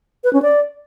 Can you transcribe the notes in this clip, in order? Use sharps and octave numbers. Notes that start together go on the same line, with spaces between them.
B4
C#4
D5